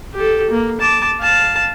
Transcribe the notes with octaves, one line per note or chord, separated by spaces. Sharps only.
G4 A4
A#3
A5 D6
F5 A5